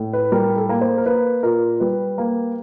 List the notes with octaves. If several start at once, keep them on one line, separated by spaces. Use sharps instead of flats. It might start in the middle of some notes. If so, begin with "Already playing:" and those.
Already playing: A2
B4
G3 A#4
A4
A#3
C5
A#4
A#3 B4
A#2 A#4
G3 B4
A#3